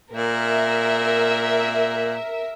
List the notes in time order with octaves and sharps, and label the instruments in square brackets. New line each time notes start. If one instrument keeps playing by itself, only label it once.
[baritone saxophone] A#2 [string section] A#4 E5